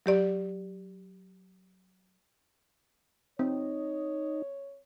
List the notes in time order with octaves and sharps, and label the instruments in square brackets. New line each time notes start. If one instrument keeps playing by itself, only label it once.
[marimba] F#3 G4 D5
[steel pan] C4 [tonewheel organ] D#4 [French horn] C#5